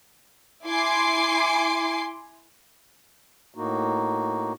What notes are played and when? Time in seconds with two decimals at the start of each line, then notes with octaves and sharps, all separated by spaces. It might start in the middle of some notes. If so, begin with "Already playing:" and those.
0.68 E4 G#5 C6 D6 C7
3.55 A2 A#3 D#4 F#4